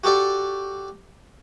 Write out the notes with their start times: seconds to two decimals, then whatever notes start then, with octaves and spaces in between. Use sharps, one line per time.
0.04 F#4 G4 A4 D5